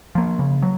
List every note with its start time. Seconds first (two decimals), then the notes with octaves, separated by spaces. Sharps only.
0.15 F3 A#3
0.39 C#3
0.62 F#3